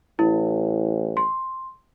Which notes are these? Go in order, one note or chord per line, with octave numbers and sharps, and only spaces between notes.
A1 E4
C6